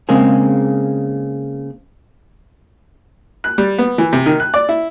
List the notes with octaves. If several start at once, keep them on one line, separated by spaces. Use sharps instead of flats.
C#3 G#3 A#3 C4 G#4
F#6
G3
B3
E3
C3
D#3
F#6
D5
E4